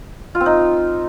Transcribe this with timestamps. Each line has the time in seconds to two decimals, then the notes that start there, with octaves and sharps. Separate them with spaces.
0.35 F4
0.40 C4
0.46 D#4